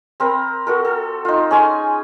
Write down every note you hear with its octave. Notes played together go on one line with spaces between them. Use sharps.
C4 A#4 B5
F#4 A4 A#4
A4
D#4 F4
C#4 G#4 G#5 C6